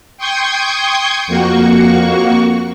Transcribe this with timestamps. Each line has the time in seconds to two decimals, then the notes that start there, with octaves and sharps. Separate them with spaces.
0.18 G5 C6 C#6 D#6 G6 G#6
1.27 F2 A#3 F#4 C#6